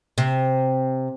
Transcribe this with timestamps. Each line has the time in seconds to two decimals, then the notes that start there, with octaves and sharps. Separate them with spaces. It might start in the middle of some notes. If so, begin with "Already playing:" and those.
0.18 C3